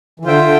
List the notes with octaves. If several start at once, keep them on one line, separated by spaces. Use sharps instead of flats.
E3
D3 F4 C5 E5 G5
D3